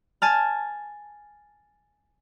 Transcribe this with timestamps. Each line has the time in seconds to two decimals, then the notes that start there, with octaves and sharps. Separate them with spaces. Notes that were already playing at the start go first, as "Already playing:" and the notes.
0.22 G#5 A5 F6